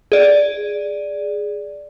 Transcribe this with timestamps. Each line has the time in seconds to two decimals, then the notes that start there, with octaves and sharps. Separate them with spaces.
0.12 G#4 D5